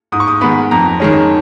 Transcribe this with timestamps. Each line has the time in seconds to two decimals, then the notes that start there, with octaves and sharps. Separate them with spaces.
0.12 G#2 D#6
0.20 C#6
0.27 D#6
0.41 D#3 G#3 B3 B5
0.71 F2 A#5
1.00 D#3 G#3 C#4